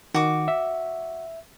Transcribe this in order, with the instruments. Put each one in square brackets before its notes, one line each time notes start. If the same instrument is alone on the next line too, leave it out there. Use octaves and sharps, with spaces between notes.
[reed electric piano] D#3 [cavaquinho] F#4 D6
[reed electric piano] E5